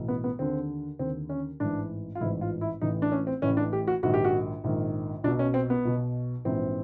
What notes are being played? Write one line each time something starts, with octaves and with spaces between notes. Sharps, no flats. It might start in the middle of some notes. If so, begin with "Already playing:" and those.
Already playing: B1 A2 E3
B3
B3
D#2 D3 C4
D#2 D3 C4
C#4
A1 G#2 E3 D4
F4
A1 G#2 E3 E4
F4
E4
A1 A2 E3 D#4
D4
C#4
C4
A1 A2 E3 C#4
D4
G4
F#4
A#1 G#2 D#3 F#4
G4
F#4
A#1 G#2 D#3
B1 B2 D4
C#4
C4
B3
B1 B2
A#1 G#2 E3 C4